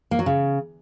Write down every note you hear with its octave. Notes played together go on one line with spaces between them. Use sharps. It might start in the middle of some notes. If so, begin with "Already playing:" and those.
A#3
F#3
C#3